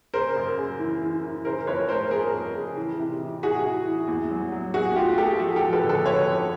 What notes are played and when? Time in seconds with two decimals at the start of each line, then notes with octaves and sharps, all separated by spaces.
0.14 C#3 A#4 C5
0.36 F#2
0.58 C#3
0.79 E3
1.01 E3
1.23 E3
1.45 C#3 A#4 C5
1.67 F2 B4 C#5
1.89 A3 A#4 C5
2.11 F2 G#4 A#4
2.33 F2
2.55 C#3
2.77 E3
2.99 C3
3.20 E3
3.43 C3 F#4 G#4
3.64 E3
3.87 E3
4.08 E2
4.31 F#3
4.52 F#3
4.74 E2 F#4 G#4
4.95 A3 F4 G4
5.17 A3 G4 A4
5.40 F3 F#4 G#4
5.56 G4 A4
5.62 F3
5.73 A4 B4
5.84 D3
5.89 A4 B4
6.05 D3 B4 C#5
6.28 F2